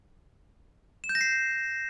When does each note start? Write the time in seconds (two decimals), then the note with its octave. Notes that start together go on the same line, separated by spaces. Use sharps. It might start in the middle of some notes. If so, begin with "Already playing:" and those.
1.04 E7
1.09 G6
1.15 A#6
1.21 C7